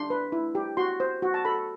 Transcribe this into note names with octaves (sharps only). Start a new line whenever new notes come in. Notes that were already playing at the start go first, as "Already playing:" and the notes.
Already playing: D4 C6
B4
E4
G4
F#4 C6
C5
F#4
A5
A4 B5